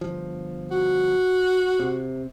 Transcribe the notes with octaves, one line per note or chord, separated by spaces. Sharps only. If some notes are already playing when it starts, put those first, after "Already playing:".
G1 F3
F#4
C3